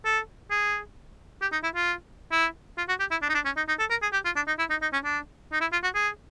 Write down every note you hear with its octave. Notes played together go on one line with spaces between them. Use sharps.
A4
G#4
G4
D#4
E4
F4
E4
F4
F#4
G4
E4
D4
D#4
D4
C#4
D#4
D#4
A4
A#4
G#4
G4
F4
D4
D#4
E4
D#4
D#4
C#4
D4
D#4
E4
F4
F#4
G#4